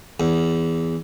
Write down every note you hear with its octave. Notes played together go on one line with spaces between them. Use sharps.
E2